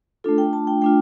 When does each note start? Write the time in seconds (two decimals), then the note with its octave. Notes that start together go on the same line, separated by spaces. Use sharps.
0.24 A3 D4 F4 A4
0.38 G5
0.53 A5
0.67 G5
0.82 A3 D4 F4 G5